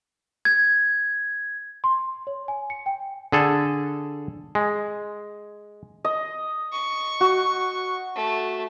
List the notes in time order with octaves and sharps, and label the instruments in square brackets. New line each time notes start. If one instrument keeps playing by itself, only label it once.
[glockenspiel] G#6
[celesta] C6
C#5
G#5
C#7
G5
[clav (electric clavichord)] D3 G#4 A4
G#3
[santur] D#5
[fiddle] C#6
[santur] F#4
[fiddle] A3